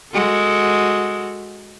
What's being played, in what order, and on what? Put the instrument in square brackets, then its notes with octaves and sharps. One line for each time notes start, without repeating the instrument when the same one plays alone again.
[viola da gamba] G#3 F#4 A4